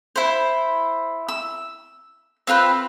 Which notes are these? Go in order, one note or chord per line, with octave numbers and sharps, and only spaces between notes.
E4 C5
E6
C4 F4 A#4 B4